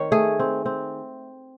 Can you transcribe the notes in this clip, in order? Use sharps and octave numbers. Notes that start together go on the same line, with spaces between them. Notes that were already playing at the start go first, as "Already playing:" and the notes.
Already playing: D#3 C4 C#5
A3 G#4
C4
C4